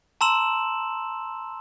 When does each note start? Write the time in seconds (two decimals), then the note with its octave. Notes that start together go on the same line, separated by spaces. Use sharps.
0.21 A5 A#5 C6 E6 E7 F#7